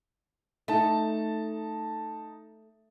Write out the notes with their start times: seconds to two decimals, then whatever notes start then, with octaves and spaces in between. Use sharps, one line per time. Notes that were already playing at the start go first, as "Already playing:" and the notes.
0.68 A3 D#4 A5